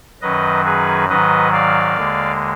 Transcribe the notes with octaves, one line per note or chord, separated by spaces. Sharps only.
F#2 D#3 F#3 B4 D#5
G#4 B4
G#2 D#3 F#3 B4 D#5
D5 F5
D#2 D3 G#3